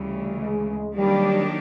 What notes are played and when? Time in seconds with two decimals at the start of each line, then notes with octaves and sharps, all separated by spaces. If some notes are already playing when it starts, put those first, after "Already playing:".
Already playing: D2 C#3 E3 G3
0.41 G#3
0.95 D#3 F#3 G3 A#3 D4 G4